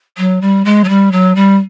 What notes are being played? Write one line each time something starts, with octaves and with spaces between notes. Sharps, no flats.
F#3
G3
G#3
F#3
G3
F#3
G3